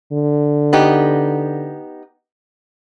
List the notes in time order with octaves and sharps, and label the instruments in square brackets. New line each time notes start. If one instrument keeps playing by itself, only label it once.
[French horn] D3
[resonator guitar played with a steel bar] B3 D#4 G4